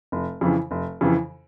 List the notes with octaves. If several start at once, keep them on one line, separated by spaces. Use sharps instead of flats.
F1
F2 C#3 E3
F1
F2 C#3 E3